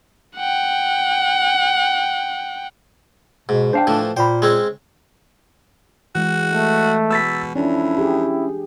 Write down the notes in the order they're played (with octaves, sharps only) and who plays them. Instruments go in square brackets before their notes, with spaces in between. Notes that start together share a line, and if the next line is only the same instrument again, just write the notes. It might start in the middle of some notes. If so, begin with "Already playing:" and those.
[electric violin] F#5 G5
[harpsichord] G#2 [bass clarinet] B2
[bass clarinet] D4 [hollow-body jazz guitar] C5 F5 G5
[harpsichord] A2 E3 F3
[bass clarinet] A#2 [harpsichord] C5 [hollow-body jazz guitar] G5 B5
[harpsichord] G#3 C4 C#4
[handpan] E3 G#3 [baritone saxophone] F#4
[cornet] A3
[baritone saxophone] B2 [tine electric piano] E6 A6 B6
[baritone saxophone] F2 [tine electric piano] C#4 [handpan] D4 [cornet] E4
[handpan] G4 G#4